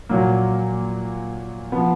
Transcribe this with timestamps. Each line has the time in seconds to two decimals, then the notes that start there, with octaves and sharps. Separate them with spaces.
0.09 A#2 F#3 A#3
1.72 F3 B3